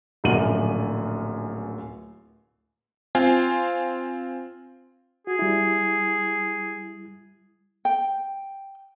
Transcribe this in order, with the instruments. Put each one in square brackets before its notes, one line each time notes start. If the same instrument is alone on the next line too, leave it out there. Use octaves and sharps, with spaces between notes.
[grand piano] D1 A#1 F#2 F#5 D#7 F#7
[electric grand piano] C4 F4 F5 G#5
[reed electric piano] F#4 [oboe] G#4
[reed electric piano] G3 E4
[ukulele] G5